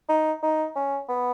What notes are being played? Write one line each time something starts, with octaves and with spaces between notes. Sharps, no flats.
D#4
D#4
C#4
B3